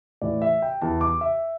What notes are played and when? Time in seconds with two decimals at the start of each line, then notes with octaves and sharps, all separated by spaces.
0.22 A2 E3 D5
0.42 E5
0.62 G5
0.81 E2 E3 A5
1.01 D6
1.21 E5